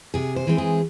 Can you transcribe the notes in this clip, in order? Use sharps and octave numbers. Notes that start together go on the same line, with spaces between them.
C3 G#4
C5
E3 G#3 C4
G#4